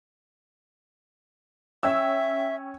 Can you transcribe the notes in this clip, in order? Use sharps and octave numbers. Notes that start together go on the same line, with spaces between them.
C#4 E5 G5 E6